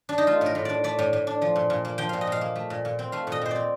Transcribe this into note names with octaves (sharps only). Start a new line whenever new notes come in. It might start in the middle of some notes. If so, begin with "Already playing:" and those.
D4
D#4
A3 F4
A2 A#4
A2
D4 D5
A3 D5
A2
A2
D4
F3
A#2
A#2
A#3
F3 G5
A#2 F5
D#5
A#2 F5
A#3
A3
A#2
A#2
C4
A3 F5
A#2 D#5
A#2 C5
C4 D5